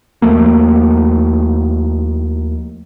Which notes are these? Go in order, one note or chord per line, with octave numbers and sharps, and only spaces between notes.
D#2 F3 A3 A#3